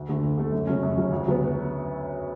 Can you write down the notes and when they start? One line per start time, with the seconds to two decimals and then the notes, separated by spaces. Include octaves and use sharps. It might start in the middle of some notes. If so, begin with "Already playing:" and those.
Already playing: D2
0.09 D3 A3
0.24 D2
0.38 D3 A3
0.52 F#2
0.67 C#3 F#3 C#4
0.83 F#2
0.98 C#3 F#3 C#4
1.12 D2
1.26 C#3 F#3 B3